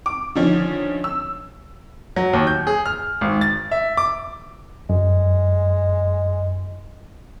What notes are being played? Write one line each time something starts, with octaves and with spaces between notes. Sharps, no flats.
D6
D3 D#3 F3 C#4
E6
F#3
D#2
G6
G#4
F6
G#1
A6
E5
D6
F#2 G#3